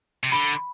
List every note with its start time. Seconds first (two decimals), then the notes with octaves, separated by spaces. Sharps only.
0.24 C3
0.32 D3 B5